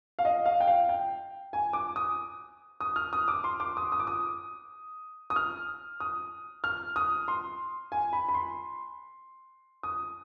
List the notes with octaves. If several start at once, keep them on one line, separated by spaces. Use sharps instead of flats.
F5
D#5
F5
G5
F5
G5
G#5
D6
D#6
D#6
F6
D#6
D6
C6
D6
D#6
D#6
D6
D#6
D#6
F6
D#6
F6
D#6
C6
G#5
B5
B5
C6
D#6